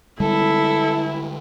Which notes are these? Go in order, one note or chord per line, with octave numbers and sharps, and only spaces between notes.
D3 G3 G#3 E4 A4